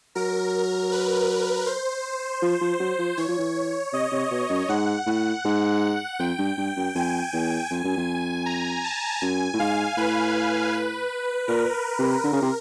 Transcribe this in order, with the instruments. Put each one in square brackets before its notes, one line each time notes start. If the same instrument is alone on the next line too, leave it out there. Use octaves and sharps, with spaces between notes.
[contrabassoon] F#3 [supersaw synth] A#4
[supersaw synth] B4
C5
[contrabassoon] F3
F3
F#3
F3
[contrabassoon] E3 [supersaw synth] C#5
[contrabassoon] F3
E3
[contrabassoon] C3 [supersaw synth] D#5
[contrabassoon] C3
B2
F#2
[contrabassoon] G#2 [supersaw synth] F#5
[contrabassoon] A2
[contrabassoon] G#2 [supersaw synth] F#5
[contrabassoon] F2 [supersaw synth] G5
[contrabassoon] G2
G2
F#2
[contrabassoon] F2 [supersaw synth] G#5
[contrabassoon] E2
F2
F#2
F2
[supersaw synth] A#5
A5
[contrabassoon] F#2 [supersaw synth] G#5
[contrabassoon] A2
[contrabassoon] G#2 [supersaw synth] F5
[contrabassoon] A2 [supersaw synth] B4
[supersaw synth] B4
[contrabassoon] A#2 [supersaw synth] A#4
[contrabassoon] C3
[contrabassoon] D3 [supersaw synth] A#4
[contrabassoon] C#3
C3